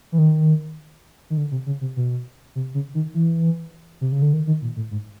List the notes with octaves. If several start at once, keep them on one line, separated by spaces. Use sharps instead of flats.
E3
D#3
D#3
D3
C3
C#3
C3
B2
C3
C#3
D#3
E3
C3
C#3
D3
D#3
D#3
A#2
A2
G#2